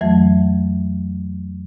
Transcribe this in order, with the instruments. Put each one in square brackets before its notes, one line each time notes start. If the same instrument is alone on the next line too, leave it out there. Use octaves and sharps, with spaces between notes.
[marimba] F2 E3 F#3 A3 G#6